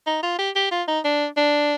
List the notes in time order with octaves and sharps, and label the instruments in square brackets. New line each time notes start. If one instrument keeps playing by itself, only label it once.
[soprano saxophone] D#4
F4
G4
G4
F4
D#4
D4
D4